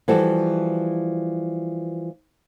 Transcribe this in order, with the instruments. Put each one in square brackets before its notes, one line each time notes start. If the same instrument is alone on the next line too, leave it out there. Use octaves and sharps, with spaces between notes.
[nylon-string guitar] E3 F3 G3 F#4 A4